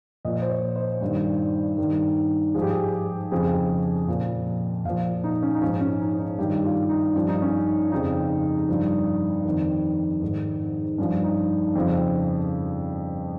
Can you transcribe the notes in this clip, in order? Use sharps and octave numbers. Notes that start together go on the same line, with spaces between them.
A#2 F3 D#5
C5
C#5
C5
G2 D#3
G2 D#3
G#2 F3 G#4
G4
G#4
F2 C#3 F3 G#4
A#2 F3
A#2 F3 F5
D#4
C#4
D#4
G#2 F3 C#4
C#4
D#4
D#4
G2 D#3 G4
F4
D#4
G2 F3 C#4
D#4
C#4
F2 C#3 F3 D#4
G2 F3
F2 D#3
G#2 D#3
G2 F3 C#4
D#4
F2 C#3 F3